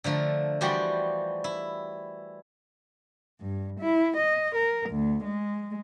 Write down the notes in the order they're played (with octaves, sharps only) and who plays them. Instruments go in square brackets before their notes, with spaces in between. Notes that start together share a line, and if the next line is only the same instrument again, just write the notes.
[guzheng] D3 F3 A3 A#4
E3 F3 G3 F#4 G4 D5
E4
[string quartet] G2
E4
D#5
A#4
D2
G#3